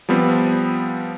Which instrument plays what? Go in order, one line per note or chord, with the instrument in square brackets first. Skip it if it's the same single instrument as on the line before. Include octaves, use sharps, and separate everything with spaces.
[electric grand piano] F3 G3 B3 C4